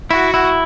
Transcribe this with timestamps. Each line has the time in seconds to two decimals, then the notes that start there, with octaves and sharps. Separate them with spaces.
0.10 E4 F#4
0.34 E4